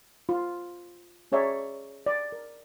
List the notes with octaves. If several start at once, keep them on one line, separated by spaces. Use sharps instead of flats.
F4
C#4 G#4 C#5 D5 E5 A#5
D5
A#4